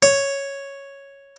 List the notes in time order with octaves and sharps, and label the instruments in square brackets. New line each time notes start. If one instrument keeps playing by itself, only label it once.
[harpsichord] C#5